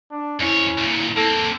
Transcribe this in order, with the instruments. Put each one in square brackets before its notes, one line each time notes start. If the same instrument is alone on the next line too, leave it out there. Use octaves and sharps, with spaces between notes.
[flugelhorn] D4
[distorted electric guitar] F2 C#5 [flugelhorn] C#4 [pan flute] E4
[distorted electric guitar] D2 A#2
[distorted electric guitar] A#3 C4 [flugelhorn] A4